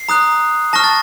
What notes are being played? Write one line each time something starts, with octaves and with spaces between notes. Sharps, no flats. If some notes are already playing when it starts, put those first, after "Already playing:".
Already playing: C7
A#5 D#6 F#6
A5 C#6 F6 A#6
A6